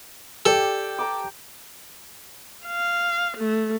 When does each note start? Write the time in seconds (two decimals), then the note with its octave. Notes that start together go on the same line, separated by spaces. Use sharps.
0.46 G4 A4 D5
0.99 A5 A#5 D6
2.66 F5
3.37 A3